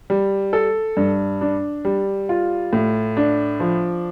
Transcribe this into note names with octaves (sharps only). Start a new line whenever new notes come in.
G3
A4
G2
D4
G3
F4
A2
D4
F3